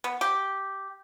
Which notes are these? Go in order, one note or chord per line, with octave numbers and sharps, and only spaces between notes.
B3
G4